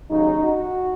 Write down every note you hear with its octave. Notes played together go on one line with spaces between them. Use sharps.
D#2 C#3 F#3 D#4
F#4